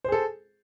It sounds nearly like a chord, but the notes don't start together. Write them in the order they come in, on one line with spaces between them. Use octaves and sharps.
C5 G#4 A4